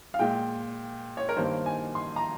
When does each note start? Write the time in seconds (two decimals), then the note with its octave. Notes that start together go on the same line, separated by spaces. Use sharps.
0.14 F5
0.19 A#2 G#3 G5
1.17 C#5
1.29 A#4
1.36 G2 D#3 G3 A#3 C5
1.66 G#5
1.95 C6
2.16 A#5